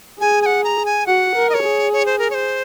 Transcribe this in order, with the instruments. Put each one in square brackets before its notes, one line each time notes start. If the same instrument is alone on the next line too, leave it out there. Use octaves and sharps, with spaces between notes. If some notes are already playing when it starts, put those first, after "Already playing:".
[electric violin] G#4 [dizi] G#5
[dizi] G#5
F#5
A#5
G#5
[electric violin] F#4 [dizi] F#5
[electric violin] A#4
[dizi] D#5
C#5
[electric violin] G#4
[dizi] C#5
C5
A#4
C#5
C5